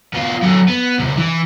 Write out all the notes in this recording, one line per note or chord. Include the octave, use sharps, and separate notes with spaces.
B2 F4
F#3 A3
B3
C#2 C3
E3